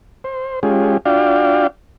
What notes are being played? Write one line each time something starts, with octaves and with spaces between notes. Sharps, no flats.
C5
G#3 C#4 F4 G4 G#4
D4 F4 F#4 D5 F5 G5